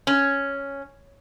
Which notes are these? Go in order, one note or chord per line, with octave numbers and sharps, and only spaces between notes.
C#4